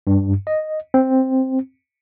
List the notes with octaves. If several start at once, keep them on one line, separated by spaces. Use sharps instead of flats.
G2
D#5
C4